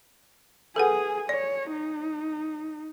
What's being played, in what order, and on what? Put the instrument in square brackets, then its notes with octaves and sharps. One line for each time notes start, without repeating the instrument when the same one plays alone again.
[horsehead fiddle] G#4 G#5 [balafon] A4 B4 F#5
[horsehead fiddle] C#5 [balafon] D5
[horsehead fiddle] D#4